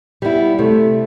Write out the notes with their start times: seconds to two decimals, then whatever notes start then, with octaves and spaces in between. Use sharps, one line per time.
0.22 G3 B3 E4
0.59 C3 A3